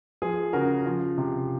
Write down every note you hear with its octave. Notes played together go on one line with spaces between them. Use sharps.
F3 G#4
C#3 F#4 A#4
F3
C3